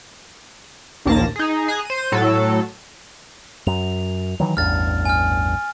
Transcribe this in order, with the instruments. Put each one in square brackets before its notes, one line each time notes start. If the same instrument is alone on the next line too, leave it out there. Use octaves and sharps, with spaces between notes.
[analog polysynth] A#1 D#2 A#3 A5 A#6
D#4 G#4
G#4 G#5 A#5 F#6
C5 D#7
A2 F#3 A4
[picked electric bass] F#2 [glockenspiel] F7
[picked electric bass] D#3 E3 F#3
[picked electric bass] A1 E2 G2 [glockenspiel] F6 A6
[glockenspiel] G#5 F6